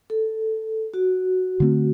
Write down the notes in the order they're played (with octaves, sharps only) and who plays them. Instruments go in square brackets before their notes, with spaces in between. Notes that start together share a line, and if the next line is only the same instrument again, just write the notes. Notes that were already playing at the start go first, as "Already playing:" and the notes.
[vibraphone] A4
F#4
[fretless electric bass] D3 A3 C4